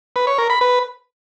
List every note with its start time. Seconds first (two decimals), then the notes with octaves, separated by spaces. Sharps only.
0.16 B4
0.27 C#5
0.38 A#4
0.50 B5
0.61 B4